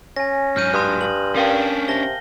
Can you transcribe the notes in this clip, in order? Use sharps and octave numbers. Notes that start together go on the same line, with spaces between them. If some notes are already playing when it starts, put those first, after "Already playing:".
C#4 G#5 A#6
G#2 F#3 F6 G6 D#7
G2 C6 D#6 F#6
G2 F#7
C#4 D4 A#4 F5 G5
C3 A5 A#6 G7